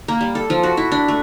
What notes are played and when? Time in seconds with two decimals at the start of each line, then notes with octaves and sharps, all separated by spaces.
0.08 A#3
0.21 G3
0.35 A4
0.50 F3
0.63 F#4
0.77 E4
0.92 D4
1.08 A3